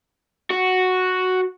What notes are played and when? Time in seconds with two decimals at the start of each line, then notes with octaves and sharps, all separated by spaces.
0.51 F#4